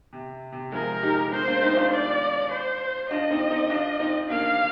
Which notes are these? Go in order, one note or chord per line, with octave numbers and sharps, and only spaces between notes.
C3
C3
F3 G#3 A#4
D#4 G4
G#3 C4 C5
A#3 D4
C4 D#4
D4 F4
D5
C5
D4 F4 D#5
C4 D#4
C4 D#4
D4 F4
C4 D#4
A#3 D4 F5